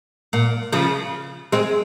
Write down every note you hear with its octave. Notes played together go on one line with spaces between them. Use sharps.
A#2
C#3 F3
G#3 C4